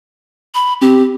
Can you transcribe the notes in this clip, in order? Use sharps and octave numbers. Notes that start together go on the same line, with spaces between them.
B5
C4 G4